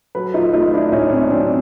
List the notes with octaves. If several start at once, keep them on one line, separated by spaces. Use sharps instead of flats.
F#3 A4 B4
D#4 F4
A3 D#4 F4
D4 E4
A2 C#4 D#4
C4 D4
F#3 C4 D4